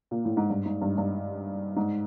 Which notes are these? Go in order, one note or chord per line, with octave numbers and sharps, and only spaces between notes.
A#2
A2
G#2
G2
G#2
G2
G2
G#2